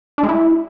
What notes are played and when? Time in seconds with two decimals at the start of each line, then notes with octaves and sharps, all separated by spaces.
0.18 D4
0.23 G#3
0.29 E4